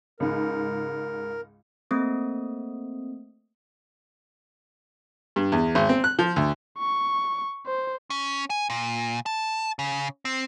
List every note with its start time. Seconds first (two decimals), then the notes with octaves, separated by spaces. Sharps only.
0.20 C#2 G#2 A#4
1.91 A3 A#3 C4 D#6
5.36 G2
5.52 E2
5.75 G#1
5.89 C4
6.04 F#6
6.19 F3
6.36 D2
6.78 C#6
7.66 C5
8.10 C#4
8.50 G#5
8.70 A#2
9.26 A5
9.79 C#3
10.25 C4